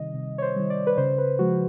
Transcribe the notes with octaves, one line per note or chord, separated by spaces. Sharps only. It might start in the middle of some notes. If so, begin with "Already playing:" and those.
Already playing: C3 D#3 G3 D#5
C3
C#5
C5
D#3 G3
D5
B4
C#3 C5
B4
F3 G#3 F#4